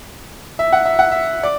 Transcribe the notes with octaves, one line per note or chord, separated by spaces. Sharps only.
E5
F#5
E5
F#5
E5
D5